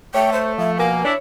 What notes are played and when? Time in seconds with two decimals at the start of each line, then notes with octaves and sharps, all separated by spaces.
0.14 A3 C#5 G5
0.33 C5
0.58 F3 E5
0.78 B2 A#3 G#5
1.05 D4 E4 C#5